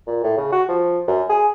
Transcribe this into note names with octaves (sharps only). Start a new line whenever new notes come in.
A#2
A2
C#3
F#4
F3
F#2
G#4